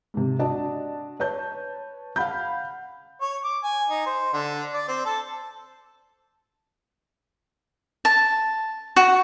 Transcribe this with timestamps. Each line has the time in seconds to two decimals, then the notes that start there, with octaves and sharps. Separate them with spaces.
0.14 G#2 C3
0.39 D4 F#4 D5 D#5 A5
1.20 B4 C#5 A5 G6
2.16 F5 F#5 B5 G6
3.21 C#5
3.44 D6
3.64 G#5
3.89 D#4
4.06 C5
4.33 D3
4.74 D5
4.88 C4
5.05 A4
8.05 A5
8.96 F#4